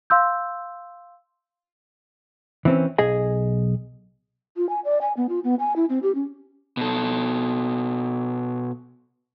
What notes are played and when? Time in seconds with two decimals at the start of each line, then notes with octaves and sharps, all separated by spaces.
0.10 F5 C6 E6 G6
2.65 E3 C4 C#4
2.98 B1 G#4 D#5 G#5
4.57 F4
4.69 G#5
4.85 D5
5.01 G#5
5.17 B3
5.29 F4
5.44 B3
5.59 G#5
5.76 E4
5.89 C4
6.03 G4
6.15 C#4
6.77 B2 A4